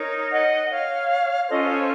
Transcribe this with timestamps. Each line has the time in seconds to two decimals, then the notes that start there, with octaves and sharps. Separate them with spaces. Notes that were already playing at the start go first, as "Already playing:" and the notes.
Already playing: D#4 A#4 C#5
0.31 D#5 F#5
0.69 C#5 F5
1.48 C#4 F4 A4 C5 D#5
1.68 C#5